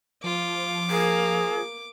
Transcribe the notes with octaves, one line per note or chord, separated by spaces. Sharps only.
F3 F4 D6
A#3 G#4